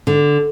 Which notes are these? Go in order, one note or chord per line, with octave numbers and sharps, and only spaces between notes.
D3